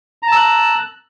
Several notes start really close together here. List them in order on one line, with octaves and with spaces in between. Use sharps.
A#5 A5 E6 F#6